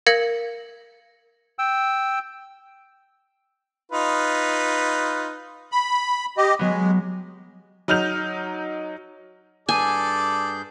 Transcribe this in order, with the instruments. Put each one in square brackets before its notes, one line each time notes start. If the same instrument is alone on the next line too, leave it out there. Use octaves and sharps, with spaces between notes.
[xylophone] A#4 F5 G#6 A#6 C#7
[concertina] G5 E6
[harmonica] D#4 F4 B4
[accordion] B5
G4 D#5
[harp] F#3 B3 [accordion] G#3
[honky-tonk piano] F#3 D#4 F6 G6 F7
[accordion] G2 G#4 G6 [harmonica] A4 D5 [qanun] G#5